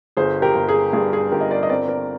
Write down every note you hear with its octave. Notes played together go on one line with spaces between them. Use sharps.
G1 G#4 C5
G4 A#4
G1
G#4
G2 G#4
G#4
G1 G4 A#4
D#5
A#4 D5
D#5
C4 A#4 D5
A#4 D5